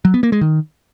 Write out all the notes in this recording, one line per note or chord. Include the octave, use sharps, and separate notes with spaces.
F#3
B3
A#3
G#3
D#3